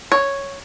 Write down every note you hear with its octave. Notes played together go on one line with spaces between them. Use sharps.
C#5